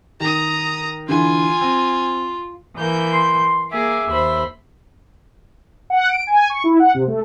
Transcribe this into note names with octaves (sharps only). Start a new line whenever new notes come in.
D#3 A#5 D#6
D3 E3 F4 G#5
C4
E3 A#3 G6
C6
A#3 G#4 E5 D6
D#2 C5 B5
F#5
D7
G#5
C#6
E4
F#5
C3
A3